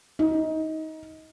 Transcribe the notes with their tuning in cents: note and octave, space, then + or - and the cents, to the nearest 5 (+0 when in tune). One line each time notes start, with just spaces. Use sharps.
D#4 +20